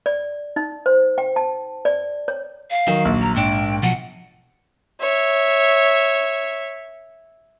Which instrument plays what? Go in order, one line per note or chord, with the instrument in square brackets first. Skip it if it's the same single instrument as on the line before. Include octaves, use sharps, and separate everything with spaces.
[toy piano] D5
D#4
C5
G5
A5
D5
C#5
[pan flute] F5
[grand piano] D#3 [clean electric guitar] F#3
[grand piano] A#1
[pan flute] A#5
[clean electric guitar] G#2 D4 [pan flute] G5
[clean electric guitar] B2 F3 F#3 [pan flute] F#5
[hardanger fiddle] C#5 E5